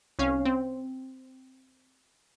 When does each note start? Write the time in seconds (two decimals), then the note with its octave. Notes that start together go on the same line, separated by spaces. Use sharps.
0.19 C2 C#4 F5
0.45 C4